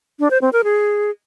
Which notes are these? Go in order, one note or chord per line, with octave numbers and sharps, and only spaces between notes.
D4
C5
C4
A#4
G#4